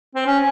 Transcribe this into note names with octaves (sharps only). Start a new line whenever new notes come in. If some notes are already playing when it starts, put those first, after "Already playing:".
C4
C#4